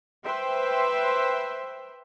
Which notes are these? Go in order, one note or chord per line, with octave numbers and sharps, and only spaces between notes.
B4 C5 E5 G5 C6